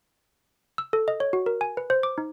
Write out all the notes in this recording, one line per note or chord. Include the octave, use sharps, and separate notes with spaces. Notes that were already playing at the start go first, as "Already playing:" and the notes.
E6
A4
D#5
C#5
F#4
A#4
G#5
B4
C5
D6
D#4